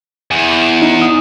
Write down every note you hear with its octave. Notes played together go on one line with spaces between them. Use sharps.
E2
D#4
D#6